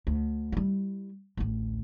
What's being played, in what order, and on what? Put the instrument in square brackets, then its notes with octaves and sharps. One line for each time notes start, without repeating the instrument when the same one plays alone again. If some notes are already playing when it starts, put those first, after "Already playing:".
[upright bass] D2
G3 E4
A1 D2